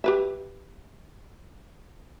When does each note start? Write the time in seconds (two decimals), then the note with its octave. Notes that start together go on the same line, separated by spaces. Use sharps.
0.04 G4 B4 E5